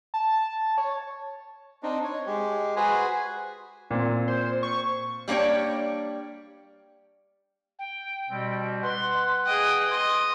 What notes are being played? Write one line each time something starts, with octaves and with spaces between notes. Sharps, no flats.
A5
C#5
C4 D4 D#4
C#5
G#3 G4
F#4 G#4 B4 C5 G#5
A#2 C4
C5
C#6
G3 A#3 D4 C#5 G5
G5
B2 G3 C4
B4 F#5 C6
G#4 D#5 G5
D#5 C6